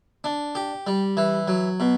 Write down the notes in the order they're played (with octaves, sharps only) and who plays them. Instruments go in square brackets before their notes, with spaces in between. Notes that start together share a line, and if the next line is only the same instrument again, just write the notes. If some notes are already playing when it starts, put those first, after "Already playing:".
[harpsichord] D4
G4
G3
E3
F#3
B2